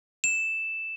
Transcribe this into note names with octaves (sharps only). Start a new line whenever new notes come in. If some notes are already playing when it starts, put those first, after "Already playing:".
E7